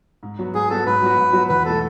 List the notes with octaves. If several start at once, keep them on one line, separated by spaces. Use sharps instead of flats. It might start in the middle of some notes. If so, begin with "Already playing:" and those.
G#2
F#3 B3 F#4
G#2 G#4
F#3 B3 F#4 A4
G#2 B4
F#3 B3 F#4
G#2
F#3 B3 F#4
E2 B4
B2 A3 A4